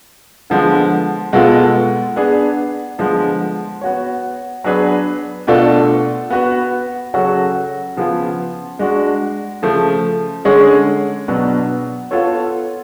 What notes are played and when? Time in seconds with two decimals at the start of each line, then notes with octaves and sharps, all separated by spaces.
0.50 D3 F3 G#3 B3
1.33 B2 G#3 B3 F4 A4
2.16 B3 D4 G#4
2.98 D3 F3 G#3 B3
3.81 B3 F#4 C#5
4.64 F#3 B3 D4 G#4 B4
5.47 B2 A3 D4 F4 A4
6.30 B3 F#4 B4
7.14 C#3 F#3 C#4 F#4 A4
7.97 C#3 F3 B3 F4 G#4
8.79 G#3 D4 F#4
9.62 C#3 F3 A3
10.45 D3 G#3 C#4 G#4 C#5
11.28 B2 F#3 B3 D4
12.11 B3 F4 A4 C#5